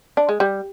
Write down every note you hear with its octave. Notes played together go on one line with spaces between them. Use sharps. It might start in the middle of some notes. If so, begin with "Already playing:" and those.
D4
G#3
G3